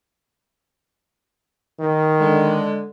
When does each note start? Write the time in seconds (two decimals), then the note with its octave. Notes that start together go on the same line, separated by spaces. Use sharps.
1.79 D#3
2.20 D3 G#3